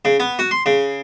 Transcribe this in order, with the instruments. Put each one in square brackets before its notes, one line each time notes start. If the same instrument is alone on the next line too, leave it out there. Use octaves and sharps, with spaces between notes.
[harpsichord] C#3
B3
F#4
C6
C#3